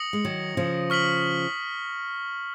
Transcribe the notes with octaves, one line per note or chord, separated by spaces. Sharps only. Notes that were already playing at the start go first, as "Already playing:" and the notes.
Already playing: D#6 A#6 C#7 F#7
G#3
D#3 F#3
C#3 F3
C#6 F6 B6 F#7